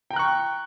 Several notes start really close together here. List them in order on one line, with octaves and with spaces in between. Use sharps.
G5 A#5 F#6 C#6